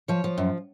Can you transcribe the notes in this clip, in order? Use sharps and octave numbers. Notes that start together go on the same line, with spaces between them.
F3 C#5
F3
F#2